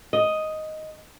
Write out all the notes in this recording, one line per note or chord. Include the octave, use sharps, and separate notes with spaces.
D#5